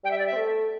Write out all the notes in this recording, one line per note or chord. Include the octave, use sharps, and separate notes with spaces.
G3 G5
E5
D5
E5
C4
A3